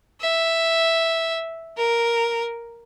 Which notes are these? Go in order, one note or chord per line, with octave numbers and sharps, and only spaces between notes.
E5
A#4